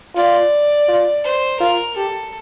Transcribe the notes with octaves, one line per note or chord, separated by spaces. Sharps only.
F4 D5
F4
C5
F4 A#4
G4 A4